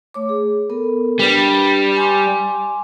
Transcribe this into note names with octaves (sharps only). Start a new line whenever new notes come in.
A3 C#5 D6
G#4
B3 A4 A#4
G3 D4 B4 D5
G#5 C6 D6